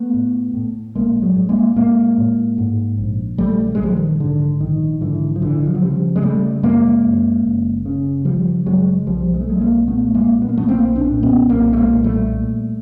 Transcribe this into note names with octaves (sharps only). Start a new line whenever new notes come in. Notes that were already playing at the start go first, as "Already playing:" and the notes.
Already playing: A3 B3
A2
A2
A#1 G#3 A#3
F#3 G#3
A2
G#3 A#3
A2 G#3 A#3
A2
G#2
A#1
A#1 G3 A3
G3
G#3
A#1 F3 G3
D#3
G#2 D3
A#1 D#3
G#2 D3 E3
F3
A#1 D3 E3
E3
F3
F#3
C#3 F3 G3
G#3
C#3 G3 A3
F#2 G#3 A#3
F#2
F#1
C#3
C#3 F3 G3
F#1 F#3 G#3
B1 F3 G3
G#3
A3
B1 F#3 G#3
A3
G#3 A#3
A#2 A3 B3
G#3 A#3
A#2
B3
A#3
A3 B3
B1 A#3 C4
C4 D4
A#2
B3 C#4
B1 A#3 C4
A3
G#3 A#3
A#2
G3 A3
A#2